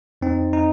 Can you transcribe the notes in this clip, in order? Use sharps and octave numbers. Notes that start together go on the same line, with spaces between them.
F2 C4 D#4
D#4